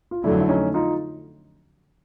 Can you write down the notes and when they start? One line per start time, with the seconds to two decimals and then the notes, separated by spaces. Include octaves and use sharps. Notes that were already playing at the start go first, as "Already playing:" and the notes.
0.11 F4
0.23 F2 D3 F#3 A3 D4 E4
0.41 E4
0.48 C#4 D#4
0.74 D#4 F4